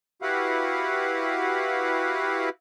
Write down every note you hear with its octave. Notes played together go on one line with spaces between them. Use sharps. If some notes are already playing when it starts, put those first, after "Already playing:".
E4 F#4 G4 B4 F5 F#5